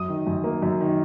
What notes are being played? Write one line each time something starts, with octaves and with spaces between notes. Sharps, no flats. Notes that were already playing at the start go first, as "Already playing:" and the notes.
Already playing: F#2 D#6
D#3
F#2
A#3
F#2
D#3